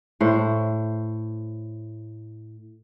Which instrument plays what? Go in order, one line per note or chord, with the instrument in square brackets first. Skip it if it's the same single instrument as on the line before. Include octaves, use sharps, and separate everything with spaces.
[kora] A2 C5